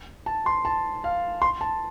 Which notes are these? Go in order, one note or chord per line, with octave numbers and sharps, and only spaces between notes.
A5
C6
A5
F5
C6
A5